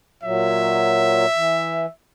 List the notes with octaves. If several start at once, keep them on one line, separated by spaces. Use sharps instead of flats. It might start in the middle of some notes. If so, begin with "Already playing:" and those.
A#2 F#3 E5
E3